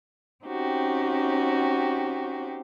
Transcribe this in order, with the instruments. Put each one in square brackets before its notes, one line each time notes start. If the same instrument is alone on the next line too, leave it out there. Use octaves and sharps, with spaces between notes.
[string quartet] C4 C#4 D#4 F#4 G4